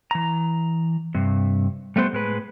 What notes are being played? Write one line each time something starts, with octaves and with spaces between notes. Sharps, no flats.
E3 A#5
G2 C3
G3 A3 B3 C5
A2 G#3 B4